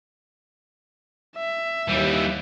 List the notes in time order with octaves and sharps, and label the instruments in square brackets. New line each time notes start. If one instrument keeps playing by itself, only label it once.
[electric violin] E5
[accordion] D#2 [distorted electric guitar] E3 G3